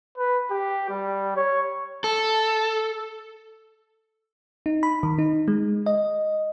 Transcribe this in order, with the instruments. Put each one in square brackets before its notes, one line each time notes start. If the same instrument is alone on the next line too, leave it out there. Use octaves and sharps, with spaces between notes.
[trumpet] B4
G4
G3
C#5
[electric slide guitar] A4
[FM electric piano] D#4
B5
D#3
D#4
G#3
D#5